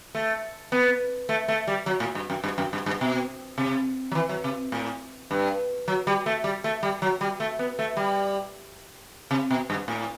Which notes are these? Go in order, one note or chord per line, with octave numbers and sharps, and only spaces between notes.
A3
B3
A3
A3
G3
F#3
A2
G2
F#2
G2
F#2
G2
G2
B2
C3
F#3
E3
F#3
C3
A2
G2
F#3
G3
A3
G3
A3
G3
F#3
G3
A3
B3
A3
G3
C3
B2
G2
A2